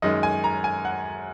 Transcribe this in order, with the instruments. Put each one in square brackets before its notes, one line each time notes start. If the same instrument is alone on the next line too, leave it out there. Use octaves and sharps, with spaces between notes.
[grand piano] F#2 D#3 G#3 D#5
G#5
A#5
G#5
F#5